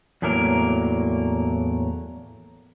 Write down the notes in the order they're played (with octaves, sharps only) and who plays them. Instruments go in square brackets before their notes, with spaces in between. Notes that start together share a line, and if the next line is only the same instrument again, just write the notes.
[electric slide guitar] E2 A2 F#3 A#3 A#4